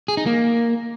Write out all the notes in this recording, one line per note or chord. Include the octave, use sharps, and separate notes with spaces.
G#4
D#4
A#3